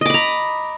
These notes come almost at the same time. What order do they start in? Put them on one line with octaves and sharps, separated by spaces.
D#5 D6 B5 A#5